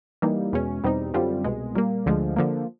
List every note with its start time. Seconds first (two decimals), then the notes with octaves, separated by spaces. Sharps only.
0.22 E3 G3 A#3 D#4
0.53 E2 B2 G#3 C#4
0.84 E2 B2 G3 C4 D#4
1.14 F#2 D3 G3 C4 F4
1.44 C2 B2 G#3
1.75 A#2 G3 A#3
2.06 D2 D3 F3 G#3
2.36 D3 F3 A#3